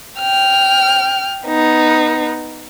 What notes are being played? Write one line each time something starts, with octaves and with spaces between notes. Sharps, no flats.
G5 F6
B3 D#4